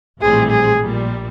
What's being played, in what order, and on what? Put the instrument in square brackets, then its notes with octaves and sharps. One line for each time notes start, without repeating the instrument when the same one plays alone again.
[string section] A#1 A2 E3 G3 C4 [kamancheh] G#4
[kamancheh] G#4
[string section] A#1 A#2 G3